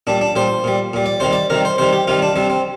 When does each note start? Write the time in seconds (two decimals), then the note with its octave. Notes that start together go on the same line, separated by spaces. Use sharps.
0.07 A#2 G3 D4
0.21 D4
0.35 A#2 G3 C5
0.64 A#2 G3
0.93 A#2 G3
1.06 D5
1.20 C3 D#3 G3 C5
1.33 D5
1.50 C3 D#3 G3 A#4
1.65 C5
1.78 C3 D#3 G3 C5
1.93 G4
2.07 C3 D#3 G3 F4
2.22 D4
2.36 C3 G3 C4
2.50 C4